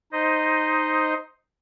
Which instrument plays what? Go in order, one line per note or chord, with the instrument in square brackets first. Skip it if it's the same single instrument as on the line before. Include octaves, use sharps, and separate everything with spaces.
[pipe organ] D#4 C5 D#5